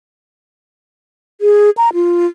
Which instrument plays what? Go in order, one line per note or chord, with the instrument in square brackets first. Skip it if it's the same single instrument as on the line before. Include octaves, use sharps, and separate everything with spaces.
[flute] G#4
A#5
F4